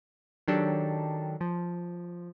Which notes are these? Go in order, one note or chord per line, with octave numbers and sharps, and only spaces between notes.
D#3 F#3 D4 G4 A4
F3